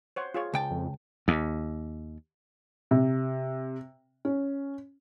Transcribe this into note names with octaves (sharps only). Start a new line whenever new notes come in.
C5 C#5 F#5
F4 G#4 C#5
C#2 G5 A5
F2
D#2
C3
C#4